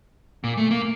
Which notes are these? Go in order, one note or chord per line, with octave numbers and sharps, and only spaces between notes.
A#2
A3
A#3